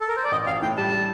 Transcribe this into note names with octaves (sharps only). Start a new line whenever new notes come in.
A4
A#4
C5
D5
A1 D#5
A1 F5
A2 G5
G3 A5
G3